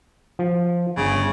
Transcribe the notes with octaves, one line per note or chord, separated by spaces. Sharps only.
F3
G1 C#3